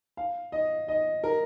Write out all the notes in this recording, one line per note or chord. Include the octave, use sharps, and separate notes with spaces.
F5
D#5
D#5
A#4